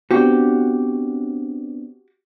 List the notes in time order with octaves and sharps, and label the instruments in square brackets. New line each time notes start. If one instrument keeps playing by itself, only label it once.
[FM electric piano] B3 C4 D4 [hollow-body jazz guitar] F#4 G4